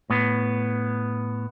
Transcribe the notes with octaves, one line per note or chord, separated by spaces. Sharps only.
A2 B3